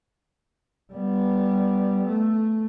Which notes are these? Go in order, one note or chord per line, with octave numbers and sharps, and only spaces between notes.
G3 B3
A3